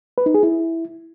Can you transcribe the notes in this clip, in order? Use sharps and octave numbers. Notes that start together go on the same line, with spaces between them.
B4
D#4
G#4
E4